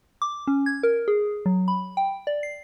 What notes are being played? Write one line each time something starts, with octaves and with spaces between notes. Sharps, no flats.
D6
C#4
G#6
A#4
G#4
F#3
B5
G5
D5
C7